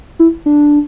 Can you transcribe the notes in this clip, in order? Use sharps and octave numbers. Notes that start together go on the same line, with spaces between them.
E4
D4